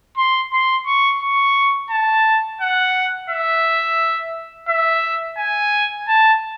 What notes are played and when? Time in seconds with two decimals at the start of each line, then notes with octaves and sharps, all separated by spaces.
0.17 C6
0.53 C6
0.86 C#6
1.22 C#6
1.90 A5
2.61 F#5
3.30 E5
4.69 E5
5.38 G#5
6.08 A5